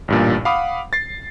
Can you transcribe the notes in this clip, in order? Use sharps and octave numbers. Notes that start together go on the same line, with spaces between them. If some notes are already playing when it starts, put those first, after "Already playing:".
A1 G2 A#2
F5 F#5 B5 D6 D#6
A6 C7